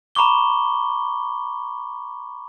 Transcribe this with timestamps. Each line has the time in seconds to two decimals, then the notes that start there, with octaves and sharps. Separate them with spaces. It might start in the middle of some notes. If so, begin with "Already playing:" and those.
0.15 A#5 B5 C#6 D6 G7